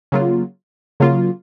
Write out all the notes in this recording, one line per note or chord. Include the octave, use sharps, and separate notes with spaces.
C#3 F#3 A#3 F4
C#3 F#3 A#3 F4